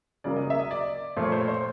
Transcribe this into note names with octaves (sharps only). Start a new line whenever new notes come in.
C#3 F#3 A#3 D5
D#5
E5
D#5
D5
A#2 F3 A3 C5
C#5
C5
C#5
C5